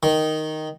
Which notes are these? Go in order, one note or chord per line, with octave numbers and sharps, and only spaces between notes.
D#3